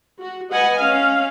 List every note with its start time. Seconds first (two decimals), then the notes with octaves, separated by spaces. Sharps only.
0.20 F#4
0.52 B4 D#5 F#5 G#5
0.80 C#4 F5